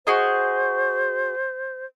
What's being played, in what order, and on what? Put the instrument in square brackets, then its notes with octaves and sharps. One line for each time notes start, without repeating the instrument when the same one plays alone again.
[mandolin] F#4 G#4 D#5 [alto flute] C5